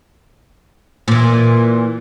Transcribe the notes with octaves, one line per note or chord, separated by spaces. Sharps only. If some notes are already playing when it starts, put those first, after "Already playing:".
A#2 E3